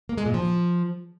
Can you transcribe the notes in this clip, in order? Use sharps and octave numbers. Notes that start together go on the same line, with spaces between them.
A#3
G#3
A#2
F3